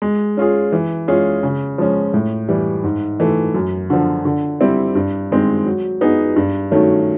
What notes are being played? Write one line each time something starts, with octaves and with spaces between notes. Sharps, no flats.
G#3
C#4 F4 G#4
E3
G#3 C#4 F4 G#4
C#3
F3 G#3 C#4
A2
E3 G3
G#2
E3 A3
F#2
D3 F3
D3
G3 C4 E4
G2
D#3 G#3 C4
F#3
B3 D#4 G#4
G2
D#3 F#3 A3 C#4